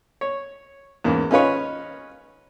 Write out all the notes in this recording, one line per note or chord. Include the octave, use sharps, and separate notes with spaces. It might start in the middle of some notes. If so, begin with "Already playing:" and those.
C#5
E2 G#2 A#3 C#4
C#4 D#4 F4 B4 C#5